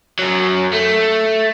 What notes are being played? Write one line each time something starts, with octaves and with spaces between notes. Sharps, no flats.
F#2 F#3
A3